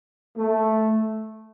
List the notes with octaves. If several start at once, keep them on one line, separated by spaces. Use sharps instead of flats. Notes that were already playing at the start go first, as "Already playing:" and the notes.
A3